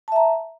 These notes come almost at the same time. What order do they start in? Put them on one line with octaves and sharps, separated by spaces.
A5 E5 A#5